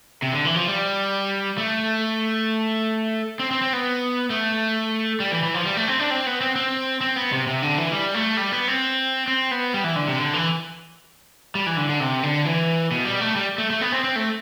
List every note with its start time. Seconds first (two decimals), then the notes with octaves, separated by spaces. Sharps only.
0.22 C3
0.33 D3
0.45 E3
0.56 F3
0.68 G3
1.58 A3
3.39 C4
3.51 C4
3.62 C4
3.73 B3
4.30 A3
5.20 G3
5.32 E3
5.43 E3
5.54 F3
5.65 G3
5.77 A3
5.88 C4
5.99 D4
6.10 C4
6.27 B3
6.41 C4
6.56 C4
7.01 C4
7.16 B3
7.32 C3
7.47 C3
7.62 D3
7.78 E3
7.92 G3
8.14 A3
8.37 G3
8.52 B3
8.68 C4
9.28 C4
9.51 B3
9.74 G3
9.84 E3
9.96 D3
10.08 C3
10.18 D3
10.34 E3
11.55 G3
11.67 E3
11.77 D3
11.89 D3
12.00 C3
12.23 D3
12.45 E3
12.91 B2
13.05 G3
13.21 A3
13.36 G3
13.58 A3
13.70 A3
13.81 B3
13.92 C4
14.04 C4
14.16 A3